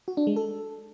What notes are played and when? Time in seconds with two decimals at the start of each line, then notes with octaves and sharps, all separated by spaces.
0.08 F#4
0.17 D4
0.27 G#3
0.36 A4